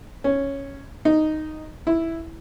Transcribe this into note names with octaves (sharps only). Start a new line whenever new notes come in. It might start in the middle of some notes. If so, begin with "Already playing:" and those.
C#4
D#4
E4